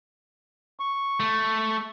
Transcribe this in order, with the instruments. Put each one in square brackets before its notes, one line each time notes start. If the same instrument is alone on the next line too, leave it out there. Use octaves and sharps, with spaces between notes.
[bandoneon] C#6
[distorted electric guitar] A3